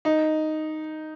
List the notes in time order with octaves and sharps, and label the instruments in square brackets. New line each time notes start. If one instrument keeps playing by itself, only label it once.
[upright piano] D#4